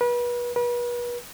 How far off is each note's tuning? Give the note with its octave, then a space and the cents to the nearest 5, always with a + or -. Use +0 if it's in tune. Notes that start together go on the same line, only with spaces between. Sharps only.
B4 -35
B4 -40